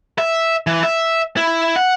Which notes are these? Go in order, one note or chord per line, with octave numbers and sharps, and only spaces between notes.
E5
E3
E5
E4
F#5